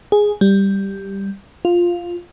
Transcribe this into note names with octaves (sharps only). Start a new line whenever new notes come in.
G#4
G3
F4